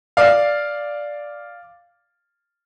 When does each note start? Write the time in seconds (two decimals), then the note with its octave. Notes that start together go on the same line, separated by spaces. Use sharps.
0.17 D5 F5